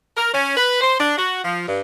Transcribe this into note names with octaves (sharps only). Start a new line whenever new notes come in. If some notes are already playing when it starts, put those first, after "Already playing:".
A#4
C#4
B4
C5
D4
F#4
F3
G2